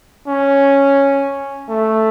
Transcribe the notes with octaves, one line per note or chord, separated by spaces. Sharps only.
C#4
A3